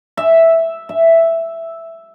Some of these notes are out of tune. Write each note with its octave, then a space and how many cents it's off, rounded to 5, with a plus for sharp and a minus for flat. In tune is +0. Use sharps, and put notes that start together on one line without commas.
E5 -5
E5 +5